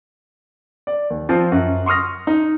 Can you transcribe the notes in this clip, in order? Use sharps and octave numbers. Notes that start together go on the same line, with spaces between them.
D5
D#2
F3 C4 F4
F#2
C6 C#6 D#6 F6 A#6
D#4